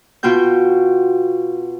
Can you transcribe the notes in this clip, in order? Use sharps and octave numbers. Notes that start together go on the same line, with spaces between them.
B2 F4 F#4 G5 G6